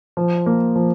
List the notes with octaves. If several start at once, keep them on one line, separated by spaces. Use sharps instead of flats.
F3
A#3
F3